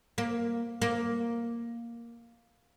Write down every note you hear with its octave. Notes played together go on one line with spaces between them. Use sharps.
A#3
A#3